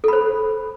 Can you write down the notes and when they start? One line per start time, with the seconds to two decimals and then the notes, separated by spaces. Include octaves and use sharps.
0.04 A4
0.08 B5
0.13 C5